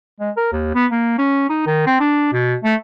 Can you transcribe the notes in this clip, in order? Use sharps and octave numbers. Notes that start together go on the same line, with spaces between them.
G#3
A#4
D#2
B3
A#3
C#4
D#4
D#3
C4
D4
B2
A3